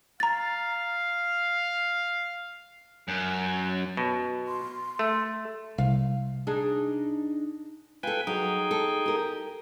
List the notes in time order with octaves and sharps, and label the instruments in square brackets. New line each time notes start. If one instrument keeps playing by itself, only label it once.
[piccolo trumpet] F5 [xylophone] A#5 A6
[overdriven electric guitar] F#2
[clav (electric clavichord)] B2
[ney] C6
[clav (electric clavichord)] A3
[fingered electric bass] C2 [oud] F5
[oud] D4 D#4 G#4
[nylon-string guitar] F4 A4 [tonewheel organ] B4 G5 G#5
[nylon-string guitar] F#3 [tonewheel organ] D#4 G#4 G5
[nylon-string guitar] A4
G4 A#4